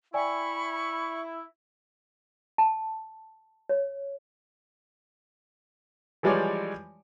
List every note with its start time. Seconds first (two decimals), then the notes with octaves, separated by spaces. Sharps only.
0.14 E4 D5 G5 G#5 B5 C#6
2.58 A5
3.69 C#5
6.23 E3 F3 G3 G#3 C#5 D5